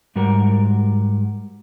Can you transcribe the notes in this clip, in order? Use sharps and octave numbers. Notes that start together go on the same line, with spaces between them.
G#2 G3 F#4 A#4